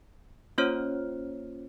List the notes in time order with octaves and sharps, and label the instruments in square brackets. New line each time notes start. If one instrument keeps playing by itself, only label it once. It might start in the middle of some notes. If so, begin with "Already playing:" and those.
[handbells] A#3 C#4 F4 C5 C#5 F6